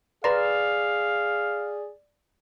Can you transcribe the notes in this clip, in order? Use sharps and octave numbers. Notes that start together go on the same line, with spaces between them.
G#4 B4 D5 F5 A#5 C6